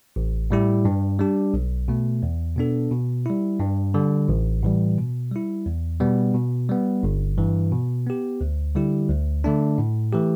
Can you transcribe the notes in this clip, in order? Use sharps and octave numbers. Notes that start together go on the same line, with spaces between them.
A1
A2 G3 E4 G4
G2
G3 D4 G4
B1
B2 A3
E2
B2 B3 D4 A4
B2
G3 E4
G2
D3 G3
A1
A2 E3 G3
B2
G3 E4
E2
B2 G3 B3
B2
G3 B3
G1
G2 E3
B2
B3 G4
D2
D3 G3 E4 G4
D2
D3 A3 D4
A2
E3 A3 G4